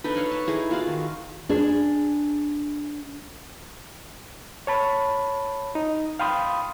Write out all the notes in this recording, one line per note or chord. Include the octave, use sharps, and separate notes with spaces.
D4 D#4 A4 B4
B4 C#5 F5 A5
A5
D#4 E4 G#4 A4
F4 F#4 D5 F5
D#3
D4 G#4
C#5 A5 B5
D#4
F5 G5 B5 C6 D#6